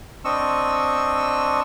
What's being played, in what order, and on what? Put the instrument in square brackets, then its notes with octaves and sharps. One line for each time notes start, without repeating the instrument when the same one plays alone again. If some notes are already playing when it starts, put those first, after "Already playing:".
[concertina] C4 D4 D#5 C#6 E6